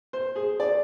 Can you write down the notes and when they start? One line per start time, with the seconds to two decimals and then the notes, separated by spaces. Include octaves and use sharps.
0.13 C5
0.36 G#4
0.60 D5